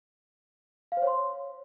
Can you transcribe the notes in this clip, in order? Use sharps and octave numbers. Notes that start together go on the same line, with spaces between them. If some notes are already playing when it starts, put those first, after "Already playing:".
F5
C5
C#5
C6